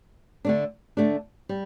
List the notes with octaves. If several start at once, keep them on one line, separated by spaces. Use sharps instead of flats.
D3 A3 D4
D3 A3 D4
G3